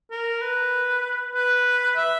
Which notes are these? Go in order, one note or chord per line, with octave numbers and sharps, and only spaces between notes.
A#4
B4
B4
E5